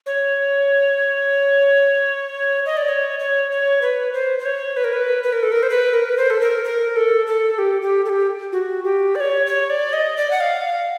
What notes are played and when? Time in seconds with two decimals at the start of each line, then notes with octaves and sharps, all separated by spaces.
0.06 C#5
2.66 D#5
2.77 D5
2.89 C#5
3.20 C#5
3.52 C#5
3.82 B4
4.13 C5
4.39 C5
4.46 C#5
4.77 B4
4.84 A#4
4.93 B4
5.23 B4
5.33 A#4
5.43 A4
5.52 A#4
5.63 C5
5.70 B4
5.94 A#4
6.09 B4
6.17 C5
6.30 A4
6.41 A#4
6.64 A#4
6.96 A4
7.27 A4
7.58 G4
7.82 G4
8.05 A4
8.09 G4
8.52 F#4
8.84 G4
9.15 D5
9.20 C#5
9.46 C#5
9.70 D5
9.93 D#5
10.17 D5
10.31 F#5
10.40 F5